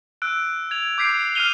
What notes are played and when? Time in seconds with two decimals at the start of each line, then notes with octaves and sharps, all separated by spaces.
0.22 E6 F#6 D7
0.71 G#6 F7
0.98 D6 G6 B6 C7 D7
1.35 F6 F#6 C7 D#7 F7 G7